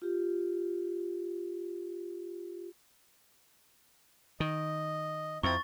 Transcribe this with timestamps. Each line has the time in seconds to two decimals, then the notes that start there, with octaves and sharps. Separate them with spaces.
0.02 F4 G4
4.40 D#3 D#5
5.43 F2 C4 E4 A#5 C#6 A6